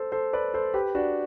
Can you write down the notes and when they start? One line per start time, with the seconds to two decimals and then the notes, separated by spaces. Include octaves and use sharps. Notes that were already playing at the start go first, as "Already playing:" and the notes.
Already playing: A4 C5
0.12 A4 C5
0.33 B4 D5
0.54 A4 C5
0.74 G4 B4
0.95 D4 F#4